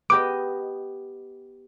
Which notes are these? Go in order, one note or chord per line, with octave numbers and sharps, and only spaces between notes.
B3 G4 D#5 D6